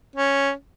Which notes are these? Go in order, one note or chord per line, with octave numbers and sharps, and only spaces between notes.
C#4